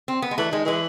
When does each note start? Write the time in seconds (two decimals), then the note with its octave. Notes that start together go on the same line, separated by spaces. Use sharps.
0.08 C4
0.22 B3
0.31 G#3
0.38 E3 A3
0.51 D#3 G#3
0.65 E3 G#3